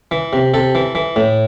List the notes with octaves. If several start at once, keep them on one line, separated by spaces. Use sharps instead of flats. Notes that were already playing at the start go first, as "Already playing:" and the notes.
E3
C3
C3 A4
E3
E3
A2